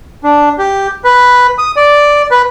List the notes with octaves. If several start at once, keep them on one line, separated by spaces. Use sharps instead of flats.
D4
G4
B4
D#6
D5
B4